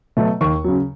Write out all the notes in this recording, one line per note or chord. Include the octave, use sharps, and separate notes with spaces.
B2 F#3 A3
D#2 C#6
C#3 F#3